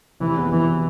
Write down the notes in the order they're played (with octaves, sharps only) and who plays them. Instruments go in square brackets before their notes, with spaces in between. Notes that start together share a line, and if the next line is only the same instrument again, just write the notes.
[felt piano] F1 [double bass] E3
[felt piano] B3
[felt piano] B2 [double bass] E3